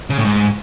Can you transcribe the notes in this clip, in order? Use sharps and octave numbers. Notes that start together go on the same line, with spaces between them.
C#3
A2
G#2